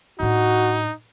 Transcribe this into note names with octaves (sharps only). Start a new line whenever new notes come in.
A2 D4 D#4 F#4